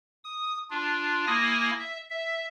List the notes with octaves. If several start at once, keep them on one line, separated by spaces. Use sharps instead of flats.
D#6
D4 F4
A#3 E4 G#5 D#6 A#6
E5
E5